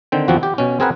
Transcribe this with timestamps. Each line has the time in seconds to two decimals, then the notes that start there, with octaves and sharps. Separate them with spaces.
0.12 D3 D#3 C4 G5
0.28 E2 F3 C4 F#4
0.43 G4
0.58 B2 C#4
0.80 C4 G#4 A#4 B4 F#5